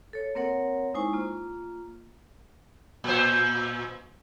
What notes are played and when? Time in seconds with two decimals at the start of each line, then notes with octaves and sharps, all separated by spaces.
0.13 A4 C#5
0.35 A#3 C4 A#4 C#5 F#5
0.94 G#3 D#4 E4 C5 G#5 C#6
1.13 A#3 F4
3.04 A#2 C5